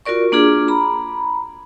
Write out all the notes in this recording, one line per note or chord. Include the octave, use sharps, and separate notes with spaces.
F4 F#4 A#4 D5 C#6
A#3 D4 F4 G#4
A#5 B5